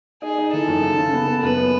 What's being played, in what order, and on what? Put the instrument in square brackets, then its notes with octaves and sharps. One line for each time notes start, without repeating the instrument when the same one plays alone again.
[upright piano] D#4 [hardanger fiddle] G#4
[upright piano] D#4
[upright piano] E3 [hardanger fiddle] A4
[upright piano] F#2
C#3
C#3
B3
B3
[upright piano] F#2 [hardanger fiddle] B4
[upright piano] B3